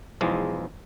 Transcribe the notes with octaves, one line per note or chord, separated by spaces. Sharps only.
B1 E2 F3 G#3